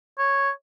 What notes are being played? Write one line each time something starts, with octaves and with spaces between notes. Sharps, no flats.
C#5